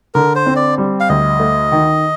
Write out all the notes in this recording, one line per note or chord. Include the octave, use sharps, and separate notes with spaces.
D3 A#4
C5
C4
D5
G3
F5
D2 D#5
A3
D#3